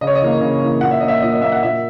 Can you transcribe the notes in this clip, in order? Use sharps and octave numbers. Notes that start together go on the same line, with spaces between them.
C#3 D#5
C#5
D#5
E3 A#3
C#3
E3 A#3
A#2 F#5
E5
A#3 D#5
E5
A#2 D#5
D#5
A#3 E5
F#5
A#2 E5